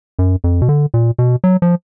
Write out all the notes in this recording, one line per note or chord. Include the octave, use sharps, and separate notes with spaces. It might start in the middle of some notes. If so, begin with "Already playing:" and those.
F#2
F2
B2
D3
A#2
B2
F#3
F3